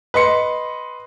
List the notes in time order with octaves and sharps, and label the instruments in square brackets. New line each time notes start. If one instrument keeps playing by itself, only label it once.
[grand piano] B4 D#5 C6 C#7